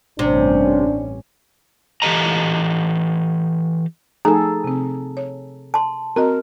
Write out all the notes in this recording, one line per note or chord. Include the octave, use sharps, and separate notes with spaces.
A1 G2 C3 C#4 D4
E3 G4 A4 D#5 A#5
F3 A3 D#4 G#4 A4 A#5
C3 C4
C#5
A5 C6
C4 F#4 A#4 D#5